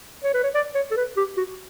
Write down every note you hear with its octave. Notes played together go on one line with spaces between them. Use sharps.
C#5
B4
C#5
D5
C#5
A4
B4
G4
F#4